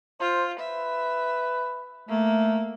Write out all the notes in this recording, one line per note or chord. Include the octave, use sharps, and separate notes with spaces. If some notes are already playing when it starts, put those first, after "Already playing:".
F4 C5
B4 E5
A3 A#3